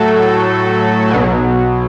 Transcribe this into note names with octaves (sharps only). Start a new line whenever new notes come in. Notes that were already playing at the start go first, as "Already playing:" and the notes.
Already playing: A2 F#3 A3 F#4 A4
B1 B2 F#3